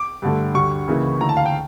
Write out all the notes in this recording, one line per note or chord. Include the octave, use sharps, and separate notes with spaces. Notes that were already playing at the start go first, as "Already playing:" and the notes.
Already playing: D6
G2 D3 A3
D2 D3 G3 C#6
C#2 C#3 E3 A#3 E4
D2 D3 A3 E4 A#5
A5
F5
G5